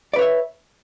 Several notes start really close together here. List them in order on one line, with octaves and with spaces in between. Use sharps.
D5 B4 C#5 E5